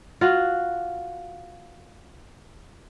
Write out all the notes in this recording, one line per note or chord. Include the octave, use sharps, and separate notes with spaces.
F4 F#4